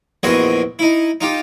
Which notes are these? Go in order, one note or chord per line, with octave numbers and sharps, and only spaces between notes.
A#1 E2 C4 F#4 G#4 D#5
D#4 E4
D#4 F4 G4